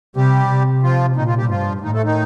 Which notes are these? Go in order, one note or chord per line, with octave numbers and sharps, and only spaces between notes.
C3 G3 G4
C3
F3 F4
A#2 D#3 D#4
F3 F4
G3 G4
G2 F3 F4
A2 D#3 D#4
A3 A4
D#3 D#4